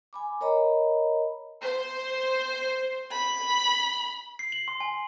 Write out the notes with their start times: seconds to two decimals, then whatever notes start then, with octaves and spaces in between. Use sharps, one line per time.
0.13 G#5 B5 D6
0.41 A#4 C#5 D#5 A#5 B5
1.63 C5
3.12 B5
4.39 C7
4.52 F#7
4.68 C6
4.80 G#5